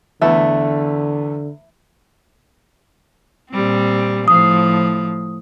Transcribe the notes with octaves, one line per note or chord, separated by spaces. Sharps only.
E2 D3 A3 B3 E4 E5
A#2 G3 C4
A2 F3 D#6